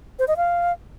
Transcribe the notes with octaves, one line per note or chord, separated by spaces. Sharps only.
C5
D#5
F5